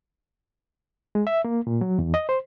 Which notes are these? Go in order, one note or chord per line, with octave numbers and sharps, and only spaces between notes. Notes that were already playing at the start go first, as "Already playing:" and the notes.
G#3
E5
A#3
A#2
F#3
E2
D#5
C5